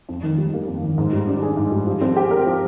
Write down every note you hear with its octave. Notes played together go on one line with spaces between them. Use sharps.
F2
D#3
G3
A#3
F2
D#3
G#2
G3
D4
G#4
G#2
G3
F3
C4
G4
A#4
F3